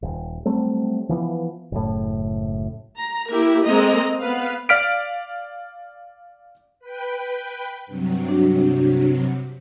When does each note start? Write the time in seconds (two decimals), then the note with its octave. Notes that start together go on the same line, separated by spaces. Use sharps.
0.02 D#1
0.45 F#3 G3 A3 C4
1.09 E3 F3 B3
1.72 F#1 A2
2.96 A#5
3.29 A#3 E4 G4 A#4
3.63 G#3 A#3 C4 A4 D#5 A#5
4.20 B3 B4 F5
4.69 D5 F5 F6 B6 D7
6.80 B4 G5
7.87 G2 C3 F#3
8.29 D4 F#4